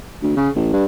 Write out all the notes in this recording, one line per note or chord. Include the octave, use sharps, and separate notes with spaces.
D2
C#3
A1
G2